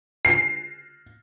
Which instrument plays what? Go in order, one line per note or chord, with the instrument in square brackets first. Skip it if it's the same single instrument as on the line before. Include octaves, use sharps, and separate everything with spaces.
[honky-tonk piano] C7